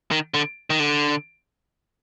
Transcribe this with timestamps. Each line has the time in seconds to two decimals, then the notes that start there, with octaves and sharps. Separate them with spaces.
0.11 D#3
0.34 D3
0.70 D#3
0.80 D3